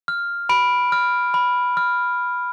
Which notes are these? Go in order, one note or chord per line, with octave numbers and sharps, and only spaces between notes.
F6
B5 D7
F6
B5
F6